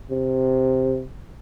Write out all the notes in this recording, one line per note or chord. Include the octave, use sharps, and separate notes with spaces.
C3